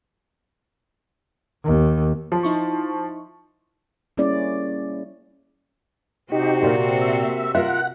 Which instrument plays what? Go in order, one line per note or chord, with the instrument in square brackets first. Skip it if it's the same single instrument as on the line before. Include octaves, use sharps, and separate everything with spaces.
[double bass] D#2
[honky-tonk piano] F3
[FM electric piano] D#4 E4 C#6
[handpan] G3 A#3 C#4 E4 G#4 D5
[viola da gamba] C3 C4 F#4 [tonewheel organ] D#4 G4
[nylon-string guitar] A#2 [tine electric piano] A#3 A#4
[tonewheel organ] E5
[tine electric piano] F4 [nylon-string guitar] A#4 E5 [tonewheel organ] F#5